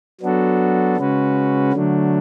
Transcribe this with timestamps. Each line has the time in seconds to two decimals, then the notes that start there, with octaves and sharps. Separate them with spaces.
0.21 F#3 B3 D4 F#4 A4
0.97 C#3 G#3 C#4 F#4 B4
1.73 D3 F#3 A3 D4